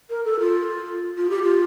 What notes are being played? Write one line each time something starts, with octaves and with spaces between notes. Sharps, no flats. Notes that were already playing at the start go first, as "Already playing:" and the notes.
A#4
A4
F4
F4
G4
F4